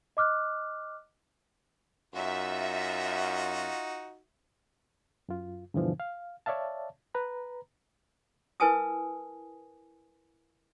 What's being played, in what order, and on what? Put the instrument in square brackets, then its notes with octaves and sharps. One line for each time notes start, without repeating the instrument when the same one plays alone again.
[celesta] D#5 D6 F6 F#6
[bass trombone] F#2 [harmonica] D#4 F4 F#4 [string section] E5
[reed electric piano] F#2 F4
G2 B2 D3 E3 F3
F5
C#5 D5 E5 F5 A5
B4 A#5 B5
[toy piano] E4 A#4 B4 G#5 A5 D#6